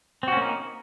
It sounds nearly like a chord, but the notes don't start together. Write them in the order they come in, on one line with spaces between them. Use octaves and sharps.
C4 F#4 C#4 A#3 D#4